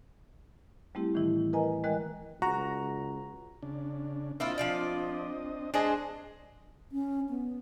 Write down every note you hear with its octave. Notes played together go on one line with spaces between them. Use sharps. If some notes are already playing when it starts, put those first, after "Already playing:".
G3 A3 C4 E4 G4
A2 D#3 E3 E4
A#4 B4 D#5 G#5 A#5
E3 G#3 A#4 D#5 G5 F#6
C#2 F#4 A#5
C#3 D4
A#3 C4 D4 E4 F4 D#5
F3 F4 D5
G#3 D4 G#4 C5 D#5
C#4
B3